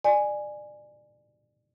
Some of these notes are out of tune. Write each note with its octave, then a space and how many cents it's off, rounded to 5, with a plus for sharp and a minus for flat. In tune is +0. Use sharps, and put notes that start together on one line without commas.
D5 +30 G#5 +0